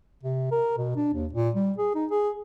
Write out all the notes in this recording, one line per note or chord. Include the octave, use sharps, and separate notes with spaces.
C3
A#4
B2
D4
D#2
A#2
G3
G#4
D#4
G#4